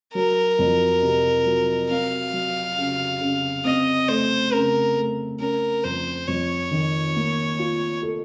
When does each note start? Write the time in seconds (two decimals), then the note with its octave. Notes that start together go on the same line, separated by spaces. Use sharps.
0.14 F#3 A#4
0.59 F2
1.02 C3
1.46 F#3
1.90 C4 F5
2.33 F#3
2.78 C#3
3.21 C#3
3.65 C4 D#5
4.08 A3 C5
4.53 C#3 A#4
4.97 A3
5.40 C#4 A#4
5.84 F2 C5
6.27 F2 C#5
6.71 D#3
7.16 A#3
7.59 F4
8.03 A4